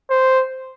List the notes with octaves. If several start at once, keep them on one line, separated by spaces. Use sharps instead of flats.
C5